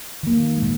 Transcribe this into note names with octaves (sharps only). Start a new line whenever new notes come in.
D#3 A#3
A#2 G#3